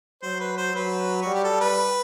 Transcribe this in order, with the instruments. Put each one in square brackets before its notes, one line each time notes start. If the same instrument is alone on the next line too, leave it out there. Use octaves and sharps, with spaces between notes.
[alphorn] F#3 [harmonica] C5
[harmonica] B4
C5
[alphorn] F#3 [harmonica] B4
[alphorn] G3 [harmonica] F#4
[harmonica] G4
A4
B4